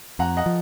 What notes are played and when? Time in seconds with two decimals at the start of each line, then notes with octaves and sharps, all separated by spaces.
0.19 F2 F#5 A#5
0.37 D#5 F#5
0.46 F3